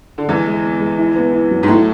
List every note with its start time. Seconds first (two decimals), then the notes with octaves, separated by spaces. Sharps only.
0.18 D3
0.28 E2 E3 G#3
0.46 G#3
0.63 B3
0.80 G#3
0.98 E4
1.16 B3
1.33 E4
1.51 F#3
1.63 G#2
1.68 A2 A3